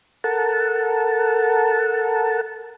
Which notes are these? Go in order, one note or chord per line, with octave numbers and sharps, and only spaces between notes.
A4 A#4 F#5 A5